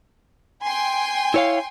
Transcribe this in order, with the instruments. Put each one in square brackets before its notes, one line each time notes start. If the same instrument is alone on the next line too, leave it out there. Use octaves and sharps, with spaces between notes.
[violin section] G5 G#5 C6
[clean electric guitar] E4 C#5 F5